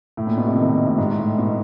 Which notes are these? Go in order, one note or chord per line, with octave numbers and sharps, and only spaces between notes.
A2
A#2
B2
C3
D#3
A#2
A2
G#2
A2
B2